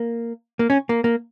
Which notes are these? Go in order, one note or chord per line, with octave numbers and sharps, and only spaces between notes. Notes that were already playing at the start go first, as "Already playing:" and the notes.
Already playing: A#3
A#3
C#4
A#3
A#3